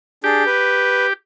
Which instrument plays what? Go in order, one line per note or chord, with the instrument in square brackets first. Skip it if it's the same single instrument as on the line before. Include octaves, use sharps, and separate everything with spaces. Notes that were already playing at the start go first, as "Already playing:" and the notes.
[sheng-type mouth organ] D4 G#4 [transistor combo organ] G4
[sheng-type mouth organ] B4